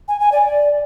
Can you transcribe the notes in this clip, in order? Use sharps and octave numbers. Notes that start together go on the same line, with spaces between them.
G#5
G#5
D5